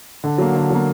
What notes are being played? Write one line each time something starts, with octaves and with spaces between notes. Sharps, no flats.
D3
F#3 A#3
D3
F#3 A#3